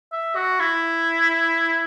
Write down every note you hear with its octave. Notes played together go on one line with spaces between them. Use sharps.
E5
F#4
E4